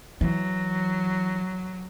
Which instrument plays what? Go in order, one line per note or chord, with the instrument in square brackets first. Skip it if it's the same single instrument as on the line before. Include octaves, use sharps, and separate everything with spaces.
[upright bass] E3 [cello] F#3